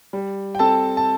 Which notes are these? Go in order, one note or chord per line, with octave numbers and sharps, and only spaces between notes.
G3
G5
C4 A4 A5
A5